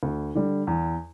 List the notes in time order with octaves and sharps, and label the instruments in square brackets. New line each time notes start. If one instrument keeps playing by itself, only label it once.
[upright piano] D2
D3 G3
E2